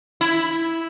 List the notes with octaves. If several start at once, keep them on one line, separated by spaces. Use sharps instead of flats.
E4